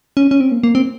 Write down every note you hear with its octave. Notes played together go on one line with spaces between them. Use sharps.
C#4
C#4
C4
A#3
A#3
C4